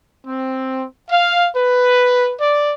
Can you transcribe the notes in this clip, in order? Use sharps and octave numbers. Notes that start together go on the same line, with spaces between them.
C4
F5
B4
D5